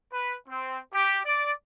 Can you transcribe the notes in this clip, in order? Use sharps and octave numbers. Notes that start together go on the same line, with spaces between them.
B4
C4
G4
D5